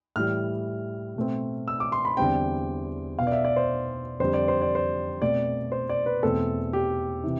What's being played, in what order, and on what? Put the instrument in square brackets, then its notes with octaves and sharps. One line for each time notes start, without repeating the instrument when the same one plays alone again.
[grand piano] A2 E3 G3 F6
B2 A3 C4
E6
D6
C6
B5
E2 D3 G3 C4 G5
B2 B3 F5
D5
E5
D5
C5
F2 D3 G3 C5
D5
C5
D5
C5
B2 A3 C4 D5
C5
D5
B4
E2 B2 A3 C4 A4
G4
C3 E3